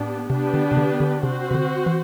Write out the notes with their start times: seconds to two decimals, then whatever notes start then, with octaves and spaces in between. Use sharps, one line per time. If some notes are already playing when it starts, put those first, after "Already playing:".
Already playing: A2 B3 D4 G4
0.30 C3 B3 D4 G4 B4
0.54 D3
0.72 C3
0.77 D3
1.00 D3
1.23 C3 C4 F#4 C5
1.51 C3
1.55 D3
1.86 E3